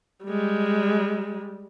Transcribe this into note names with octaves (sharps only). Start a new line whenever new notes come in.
G3 G#3